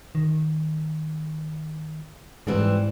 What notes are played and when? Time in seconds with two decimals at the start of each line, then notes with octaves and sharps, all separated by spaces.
0.15 D#3
2.47 G#2 E3 G3 C4